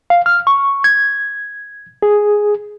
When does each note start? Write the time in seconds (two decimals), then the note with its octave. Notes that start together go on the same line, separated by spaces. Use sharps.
0.10 F5
0.26 F6
0.47 C#6
0.84 G#6
2.02 G#4